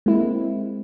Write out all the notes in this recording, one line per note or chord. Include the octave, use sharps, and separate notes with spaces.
G#3 A#3 C4 E4